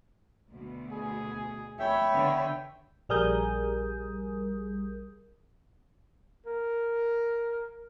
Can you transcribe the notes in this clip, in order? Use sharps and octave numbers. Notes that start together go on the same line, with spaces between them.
D2 B2
G#4
D2 C#5 E5 G5 B5
D3 B3
A#1 G3 G#4 A#4 D#6 G6
A#4